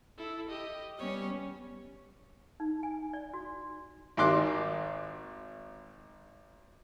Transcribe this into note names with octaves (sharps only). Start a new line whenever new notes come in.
E4 A4
G4 D#5
G3 B3 C#4 C#5
D#4
G#5
D5
F#4
G#1 D#3 D#5 C6 D6 F#6